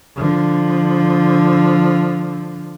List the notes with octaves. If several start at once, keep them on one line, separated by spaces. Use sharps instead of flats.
D3 F3